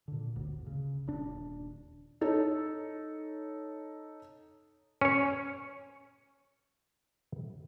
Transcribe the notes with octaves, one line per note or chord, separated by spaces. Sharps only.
A#2 D3
G1 D2
C#3
D#1 D4
D#4 A4 C#5
C#4 C#5